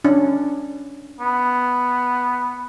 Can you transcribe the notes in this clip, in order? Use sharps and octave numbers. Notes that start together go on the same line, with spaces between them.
C#4 D4
B3